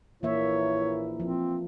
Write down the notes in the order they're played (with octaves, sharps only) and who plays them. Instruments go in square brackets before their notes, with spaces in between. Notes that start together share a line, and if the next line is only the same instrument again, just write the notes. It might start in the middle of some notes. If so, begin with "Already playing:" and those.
[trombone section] A#1 A#2 E4 [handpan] E3 A#3 E5 [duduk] C#5
[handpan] F3 [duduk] C4